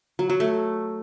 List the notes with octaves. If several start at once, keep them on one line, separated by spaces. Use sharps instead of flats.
F#3
F#3
A3